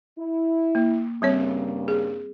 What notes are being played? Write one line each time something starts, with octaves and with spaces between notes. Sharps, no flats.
E4
A#3
G2 C#3 G3 A#3 C4 C#5
G#4